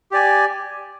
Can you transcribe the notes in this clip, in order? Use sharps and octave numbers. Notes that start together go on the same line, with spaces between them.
G4 D5 G#5